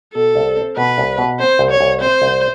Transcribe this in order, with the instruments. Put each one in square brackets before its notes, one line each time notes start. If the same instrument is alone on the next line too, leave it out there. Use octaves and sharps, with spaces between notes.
[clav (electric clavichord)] B2 [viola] A4
[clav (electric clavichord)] C2
C4
[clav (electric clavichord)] B2 [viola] B4
[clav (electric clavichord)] C2
B2
[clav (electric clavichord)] C4 [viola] C5
[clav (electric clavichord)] C2
[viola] C#5
[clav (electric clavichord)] C2
[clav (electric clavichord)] C4 [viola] C5
[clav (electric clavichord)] C2